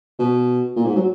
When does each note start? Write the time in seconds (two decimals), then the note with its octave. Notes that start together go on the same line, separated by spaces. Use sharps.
0.19 B2
0.76 A#2
0.86 G#2
0.96 F#3